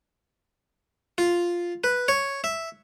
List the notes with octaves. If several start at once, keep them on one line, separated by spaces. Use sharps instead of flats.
F4
B4
C#5
E5